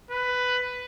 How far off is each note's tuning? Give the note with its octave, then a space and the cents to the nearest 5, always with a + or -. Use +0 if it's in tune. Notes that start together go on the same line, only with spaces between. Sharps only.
B4 +10